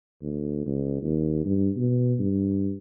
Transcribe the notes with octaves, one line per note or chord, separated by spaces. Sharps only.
D2
C#2
D#2
G2
B2
G2